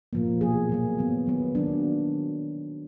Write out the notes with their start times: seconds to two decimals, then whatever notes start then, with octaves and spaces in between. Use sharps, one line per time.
0.13 A#2 F3 A#3
0.41 B2 F#3 A#3 G#4
0.69 B2 F#3 A#3
0.98 D#3 F#3 B3
1.27 D#3 F#3 B3
1.55 D#3 F#3 A#3 D4